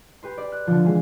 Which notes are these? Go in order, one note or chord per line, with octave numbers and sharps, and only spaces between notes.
G4 B4 C6
D5
F#6
D3 F3
E3 G#3